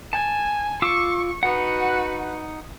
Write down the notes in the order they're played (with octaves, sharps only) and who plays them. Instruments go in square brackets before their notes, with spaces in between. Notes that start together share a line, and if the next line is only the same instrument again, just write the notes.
[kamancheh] G#5 [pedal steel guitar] A5
[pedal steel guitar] F4 D6 E6 [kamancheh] C#6
[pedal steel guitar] D#4 F#5 [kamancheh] F#4 B4